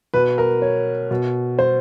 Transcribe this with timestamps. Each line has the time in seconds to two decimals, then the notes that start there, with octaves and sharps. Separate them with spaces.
0.14 B2 B4
0.38 A#4
0.62 C#5
1.11 B2
1.59 C5